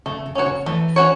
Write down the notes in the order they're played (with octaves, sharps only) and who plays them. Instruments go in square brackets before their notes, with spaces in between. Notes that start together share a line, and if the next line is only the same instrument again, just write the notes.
[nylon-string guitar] C#3 [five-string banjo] A3
[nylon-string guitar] C#3
[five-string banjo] C#4 F#4 C#5
[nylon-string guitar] C#3
[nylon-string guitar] E3 [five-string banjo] A3
[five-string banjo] C#4 F#4 C#5